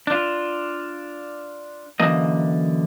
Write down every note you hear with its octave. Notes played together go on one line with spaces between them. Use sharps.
D4 F4
F#2 D3 E3 A#3 D#5